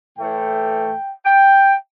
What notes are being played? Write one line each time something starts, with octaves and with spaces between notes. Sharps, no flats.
A2 E3 A3 G5
G5